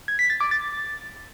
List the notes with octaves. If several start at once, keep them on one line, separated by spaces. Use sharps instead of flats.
G#6
B6
A6
D6
A6